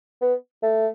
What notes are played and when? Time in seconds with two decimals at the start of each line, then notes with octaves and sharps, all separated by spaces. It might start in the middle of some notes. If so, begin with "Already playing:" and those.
0.21 B3
0.63 A3